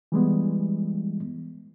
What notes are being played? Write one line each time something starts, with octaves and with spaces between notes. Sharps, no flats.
E3 G3 G#3 B3